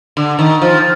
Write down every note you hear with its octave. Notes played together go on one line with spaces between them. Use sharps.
D3
D#3
F3